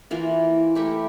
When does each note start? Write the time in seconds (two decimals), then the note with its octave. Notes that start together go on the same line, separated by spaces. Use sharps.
0.11 E3 A#3 F4 A#4
0.75 A3 E4 G4 A#4